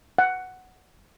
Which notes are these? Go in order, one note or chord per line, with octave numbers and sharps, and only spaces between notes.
F#5